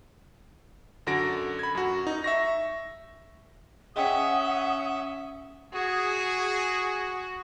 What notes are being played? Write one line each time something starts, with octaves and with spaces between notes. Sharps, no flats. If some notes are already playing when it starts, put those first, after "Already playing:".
F#2 D3 F#4 A#6 D7
B5 G#6
F#2 F#4
D#4
E5 C#6 A#6
C#4 G#4 D#5 E5 F#5 G5 D#6
F#4 G#4